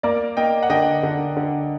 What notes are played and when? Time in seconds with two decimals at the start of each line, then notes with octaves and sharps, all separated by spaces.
0.03 A#3 A#4 D5
0.37 A#3 D#5 G5
0.63 F#5
0.70 D3 D#5 G5
1.03 D3
1.37 D3